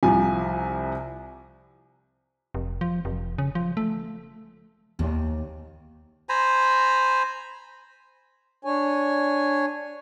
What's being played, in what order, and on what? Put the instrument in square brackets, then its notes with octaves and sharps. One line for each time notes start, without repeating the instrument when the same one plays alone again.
[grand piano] C2 C3 F3 G#5
[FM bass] F1
F3
F1
C#3
F3
A3
[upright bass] D#2
[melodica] C5 G#5 A#5 B5
[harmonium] D4 C#5 G#5